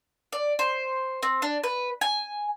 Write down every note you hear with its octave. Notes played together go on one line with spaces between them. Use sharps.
D5
C5
C4
D4
B4
G#5